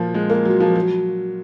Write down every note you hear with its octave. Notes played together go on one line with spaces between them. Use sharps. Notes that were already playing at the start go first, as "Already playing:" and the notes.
Already playing: A#2 F3
G#3
A#3
F#3
F3
F#3